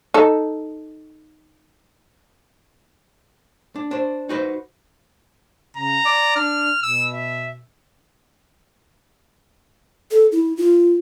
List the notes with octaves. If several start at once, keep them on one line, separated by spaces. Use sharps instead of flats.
D#4 A4
D4
D4 C5
D#4 F#4 B4 C5
C#3 A#5
D5
D4 F6
B2 E6
E5
A4
E4
F4